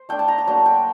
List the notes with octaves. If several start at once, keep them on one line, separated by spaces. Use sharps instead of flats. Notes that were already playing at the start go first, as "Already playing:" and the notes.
Already playing: C5
A3 D4 G5
A5
A#5
A#5
F#3 A#3 D4 A5
G5